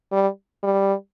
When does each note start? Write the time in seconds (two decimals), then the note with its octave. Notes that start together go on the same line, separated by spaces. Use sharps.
0.12 G3
0.63 G3